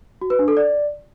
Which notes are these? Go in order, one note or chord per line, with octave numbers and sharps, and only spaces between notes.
F#4
B4
D4
A4
D5